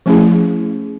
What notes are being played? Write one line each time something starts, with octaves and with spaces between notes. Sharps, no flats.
F3 A3 C#4 E4 G#4